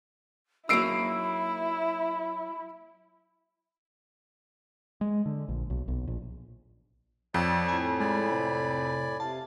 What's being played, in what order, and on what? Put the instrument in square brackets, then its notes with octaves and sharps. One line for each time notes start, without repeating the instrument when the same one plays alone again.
[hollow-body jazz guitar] F#3 A#3 D#4 [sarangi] E4 [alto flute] B5 [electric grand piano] E6 C7 D7
[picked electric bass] G#3
D3
A#1
B1
B1
A#1
[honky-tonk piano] F2 [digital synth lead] F3 [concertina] C#5 D5 A5
[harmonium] A2 [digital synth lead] G#5
[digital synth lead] G#3 [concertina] D5 G#5 B5
[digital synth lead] C3
[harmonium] C3 F5 [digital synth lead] A5